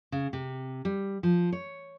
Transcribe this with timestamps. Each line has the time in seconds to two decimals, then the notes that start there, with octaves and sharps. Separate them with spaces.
0.12 C#3
0.33 C3
0.85 G3
1.23 F3
1.52 C#5